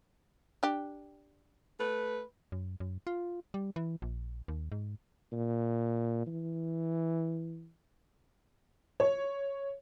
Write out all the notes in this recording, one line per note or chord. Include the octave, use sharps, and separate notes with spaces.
D4 G4
A3 B4
F#2
F#2
F4
G3
E3
A#1
D#2
G#2
A#2
E3
C#5